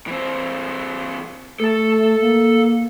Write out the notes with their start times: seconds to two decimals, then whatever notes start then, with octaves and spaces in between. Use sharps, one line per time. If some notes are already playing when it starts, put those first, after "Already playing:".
0.07 E3 C4
1.60 A3 A4 A5
2.21 A#3